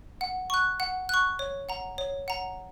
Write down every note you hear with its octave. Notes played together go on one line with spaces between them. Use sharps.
F#5
C#6 F#6
F#5
C#6 F#6
C#5
F#5 A#5
C#5
F#5 A#5